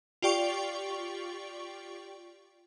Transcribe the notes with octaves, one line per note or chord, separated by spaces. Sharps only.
F4 G4 D5 G5 C#6